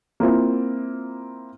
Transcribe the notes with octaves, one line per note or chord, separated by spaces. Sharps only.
A#3 C4 E4 F4